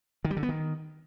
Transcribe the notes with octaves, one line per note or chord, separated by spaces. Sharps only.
D#3
G3
D3
B3
D#3